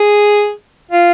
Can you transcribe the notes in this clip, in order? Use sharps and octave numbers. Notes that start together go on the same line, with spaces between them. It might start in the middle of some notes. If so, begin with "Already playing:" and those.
Already playing: G#4
F4